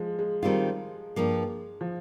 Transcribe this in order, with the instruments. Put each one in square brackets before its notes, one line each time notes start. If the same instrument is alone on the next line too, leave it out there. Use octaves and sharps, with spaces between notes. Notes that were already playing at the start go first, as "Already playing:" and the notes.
Already playing: [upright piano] F3 G#3
G#3
[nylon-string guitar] D#3 G3 C4 F4
G2 F3 A#3
[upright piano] F3